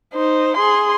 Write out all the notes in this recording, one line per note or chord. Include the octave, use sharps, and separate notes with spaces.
D#4 C5
G#4 C6